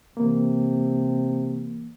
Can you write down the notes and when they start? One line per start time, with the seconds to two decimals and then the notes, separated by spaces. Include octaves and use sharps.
0.17 C3 E3 A#3